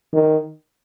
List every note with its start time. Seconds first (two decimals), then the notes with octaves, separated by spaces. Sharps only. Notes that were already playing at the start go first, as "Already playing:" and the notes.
0.13 D#3